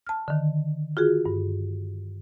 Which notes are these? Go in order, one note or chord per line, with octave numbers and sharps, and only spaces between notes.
A5 F6
D3 D#3
F4 F#4 G#4
G2